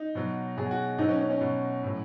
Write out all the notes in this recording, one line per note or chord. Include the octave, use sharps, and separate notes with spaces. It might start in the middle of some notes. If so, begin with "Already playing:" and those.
Already playing: D#4
B2 F#3
B2 F#3 G#4
F#4
B2 F#3 D#4
C#4
C#4
C#4
B2 F#3
A2 F#3